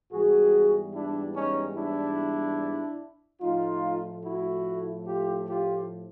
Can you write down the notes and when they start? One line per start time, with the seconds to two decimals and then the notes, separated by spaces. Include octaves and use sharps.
0.12 G#2 E3 G3 B3 F#4 G#4
0.95 D4 E4
1.36 C#4 D#4
1.76 D4 E4
3.42 A2 F3 A3 D#4 F4
4.24 E4 F#4
5.06 F4 G4
5.48 F4 G4